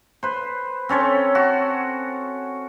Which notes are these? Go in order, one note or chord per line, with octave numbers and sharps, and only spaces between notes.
B4 C5
C4 C#4 A4 C#5
F#4